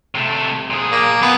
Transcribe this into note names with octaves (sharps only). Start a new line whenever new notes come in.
C3 A3
A#2 G#4
A#3
F#3 B3 G#5